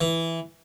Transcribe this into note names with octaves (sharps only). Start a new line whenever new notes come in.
E3